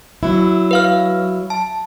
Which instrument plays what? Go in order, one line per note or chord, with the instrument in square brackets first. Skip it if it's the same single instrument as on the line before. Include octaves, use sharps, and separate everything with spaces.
[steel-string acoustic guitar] F#3 E4
[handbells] B4 F5 F6
A5